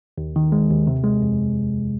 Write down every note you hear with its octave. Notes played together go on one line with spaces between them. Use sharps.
D#2
D#3
G#3
D#2
C3
G#3
F2